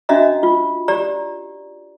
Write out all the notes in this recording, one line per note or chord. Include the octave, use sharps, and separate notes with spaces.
C#4 D4 F#4 D#5 E5 A#5
F4
G4 D5 A#5